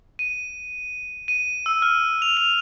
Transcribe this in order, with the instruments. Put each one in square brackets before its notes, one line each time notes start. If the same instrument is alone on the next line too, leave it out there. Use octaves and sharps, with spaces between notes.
[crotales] D#7
D#7
E6
F6
F7
F7